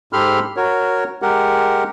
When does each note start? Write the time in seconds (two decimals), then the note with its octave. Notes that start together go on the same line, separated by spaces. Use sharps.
0.13 G#2 G4 A4 B5 C6 F6
0.57 F#4 A#4 C#5
1.22 G#3 G4 A#4 F#5